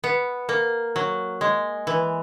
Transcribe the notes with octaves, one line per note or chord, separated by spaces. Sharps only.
B3
A#3
F#3
G#3
E3